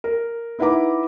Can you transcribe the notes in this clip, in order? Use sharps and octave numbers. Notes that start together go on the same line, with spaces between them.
A#4
D#4 E4 B4 F#5 A#5 D6